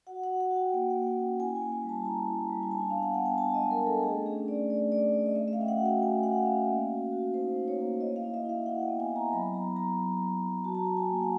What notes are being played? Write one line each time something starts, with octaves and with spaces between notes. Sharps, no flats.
F#4 F#5
F#5
F#4
F#5
F#4
G5
A#3 G5
F#5
A#3
G5
C#4
E4 G#5
G#5
A#3
G#5
G3
A5
E4 A#5
E4
G3
G#5
D4 A5
B3 F5
F#5
B3 G5
G#5
D4 A5
D#5
G#3
A#4
D4
A4
A3 G#4
C#4 G#4
A3 D5
A3 D5
A3 D5
A3 D5
D#5
A3 E5
E5
F5
C#4 G5
F#5
F#4
G5
A3 G#5
A3 F#5
C#4 F5
A#3
F#4
F#4
D#4 C5
D#4
C#5
A#3
E4 D#5
F5
E4
E5
E4 F5
E4 F#5
G5
B3
G#5
E4
A#5
F#3 B5
B3 A#5
F#3 A#5
F#3
F#3
F#3
F#4 A5
A#5
F#4 A5
G#5
A#3
F#5